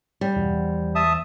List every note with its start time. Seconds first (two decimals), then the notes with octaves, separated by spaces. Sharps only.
0.21 G3
0.36 E2 G2 B2
0.53 E2 F3
0.95 E5 A5 D#6